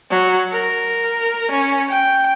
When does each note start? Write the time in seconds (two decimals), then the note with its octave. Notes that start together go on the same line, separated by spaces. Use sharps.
0.10 F#3
0.52 A#4
1.51 C#4
1.89 G5